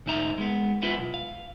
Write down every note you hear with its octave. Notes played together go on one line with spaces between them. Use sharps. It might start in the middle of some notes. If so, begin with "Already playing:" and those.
D2 G#2 D#4 E5 A#5
G#3 B3
B3 E4 F4 B4
B1
F5